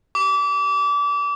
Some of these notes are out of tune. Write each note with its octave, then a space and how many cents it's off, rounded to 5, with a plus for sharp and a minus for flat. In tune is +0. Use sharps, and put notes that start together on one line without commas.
D6 -30